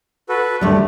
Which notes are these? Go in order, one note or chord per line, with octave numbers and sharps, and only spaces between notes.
F#4 A4 B4
D#2 D3 G3 A3